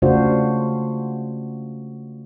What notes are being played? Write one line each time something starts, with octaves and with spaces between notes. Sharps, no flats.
C#3 A3 D4 F4 F#4 C5